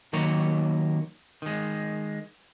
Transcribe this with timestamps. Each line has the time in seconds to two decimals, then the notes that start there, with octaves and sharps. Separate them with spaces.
0.13 D#3 F#3 A#3 A#4 C#5
1.42 D#3 G#3